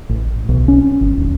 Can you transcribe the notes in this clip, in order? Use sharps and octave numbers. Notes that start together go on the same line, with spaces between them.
A1
B1
C#4
G1
D#1